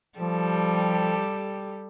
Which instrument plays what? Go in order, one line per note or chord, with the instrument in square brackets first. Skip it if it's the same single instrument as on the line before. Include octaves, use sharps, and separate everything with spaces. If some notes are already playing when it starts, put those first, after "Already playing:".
[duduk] F3 [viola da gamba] G3 G4 A4